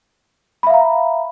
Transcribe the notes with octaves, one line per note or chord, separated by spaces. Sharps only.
E5 F5 A#5 B5